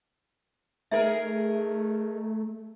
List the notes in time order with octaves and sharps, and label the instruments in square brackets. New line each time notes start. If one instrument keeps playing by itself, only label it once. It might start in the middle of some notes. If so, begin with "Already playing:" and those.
[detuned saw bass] A3 [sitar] D#4 G#4 A#4 [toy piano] E5